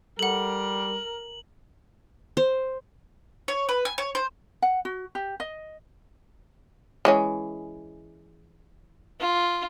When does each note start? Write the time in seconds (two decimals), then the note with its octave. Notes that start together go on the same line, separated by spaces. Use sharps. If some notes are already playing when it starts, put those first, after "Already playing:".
0.19 G3 A4 A#4 F#5 F#7
2.37 C5
3.48 C#5
3.69 B4
3.85 G#5
3.98 C#5
4.15 C5
4.62 F#5
4.85 F#4
5.15 G4
5.40 D#5
7.05 E3 G#3 C#4
9.20 F4